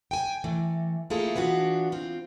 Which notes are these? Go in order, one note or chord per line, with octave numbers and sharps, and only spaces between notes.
G5 G#5
E3 A3
A3 A#3 E4 F4 G#4 A4
E3 B3 D4 F4 F#4
C4 F4